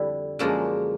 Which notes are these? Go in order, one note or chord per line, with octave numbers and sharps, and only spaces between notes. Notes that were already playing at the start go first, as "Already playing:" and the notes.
Already playing: F2 D3 G3 E4
F#2 D3 F3 G#3 A#3